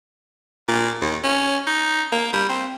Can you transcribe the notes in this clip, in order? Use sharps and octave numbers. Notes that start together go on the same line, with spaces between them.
A#2
D#2
C#4
D#4
A#3
G3
C4